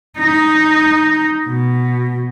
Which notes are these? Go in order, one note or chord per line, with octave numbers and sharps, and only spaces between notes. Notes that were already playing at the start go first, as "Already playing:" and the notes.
D#4
B2